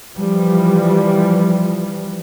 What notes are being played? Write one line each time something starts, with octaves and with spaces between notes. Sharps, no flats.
E3 F3 G3